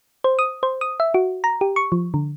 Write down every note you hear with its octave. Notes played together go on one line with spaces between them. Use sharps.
C5
D#6
C5
D#6
E5
F#4
A#5
G4
C#6
F3
D3